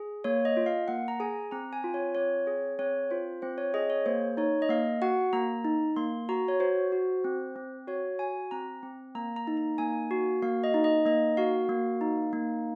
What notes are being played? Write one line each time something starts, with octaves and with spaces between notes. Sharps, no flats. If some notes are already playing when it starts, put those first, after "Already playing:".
Already playing: G#4
A#3 C#5
D#5
F4
F5
A#3 F#5
A#5
G#4 G#5
C4 A#5
G#5
F4
C#5
C4 C#5
G#4
C4 C#5
F4 C5
C4 C5
C#5
G#4 D#5
C#5
A#3 C5
D#4 C#5
D#5
A#3 F5
F#4 F#5
A#3 A#5
D#4
A#3 C6
F#4 A#5
C#5
F#4 C5
F#4
C4
C4
F#4 C#5
F#4 G#5
C4 A#5
C4
A#3 A#5
A#5
D#4
A#5
A#3 G#5
F#4
A#3 F5
D#5
D#4
D#5
A#3 D#5
F#4 F5
A#3
D#4
A#3